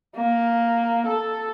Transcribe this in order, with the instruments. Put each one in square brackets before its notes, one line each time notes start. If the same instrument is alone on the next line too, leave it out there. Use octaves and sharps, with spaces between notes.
[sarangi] A#3
A4